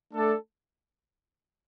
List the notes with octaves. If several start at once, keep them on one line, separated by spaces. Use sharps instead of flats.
A3 D4 A4 D5